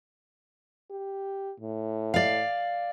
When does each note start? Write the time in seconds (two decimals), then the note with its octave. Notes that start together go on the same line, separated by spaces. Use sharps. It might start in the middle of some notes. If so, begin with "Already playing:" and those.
0.91 G4
1.60 A2
2.14 D5 F5